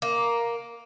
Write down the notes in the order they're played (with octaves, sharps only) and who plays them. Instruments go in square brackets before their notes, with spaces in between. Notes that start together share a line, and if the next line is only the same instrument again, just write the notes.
[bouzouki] A#3